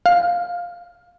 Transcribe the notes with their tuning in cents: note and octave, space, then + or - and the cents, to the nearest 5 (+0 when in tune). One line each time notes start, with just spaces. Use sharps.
F5 +10